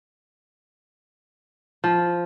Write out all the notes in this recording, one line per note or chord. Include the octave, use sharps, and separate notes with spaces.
F3